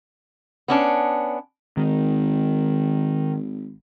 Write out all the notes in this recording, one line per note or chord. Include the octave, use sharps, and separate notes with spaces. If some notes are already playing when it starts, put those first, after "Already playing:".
B3 C#4 D4
G#1 D#3